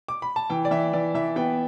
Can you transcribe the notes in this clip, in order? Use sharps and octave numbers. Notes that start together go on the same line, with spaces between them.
D6
B5
A5
E3 G5
D5
E3 E5
E3 D5
E3 E5
B3 G5